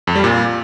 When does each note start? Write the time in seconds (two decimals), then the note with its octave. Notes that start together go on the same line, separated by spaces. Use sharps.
0.07 F2
0.16 G3
0.24 A#2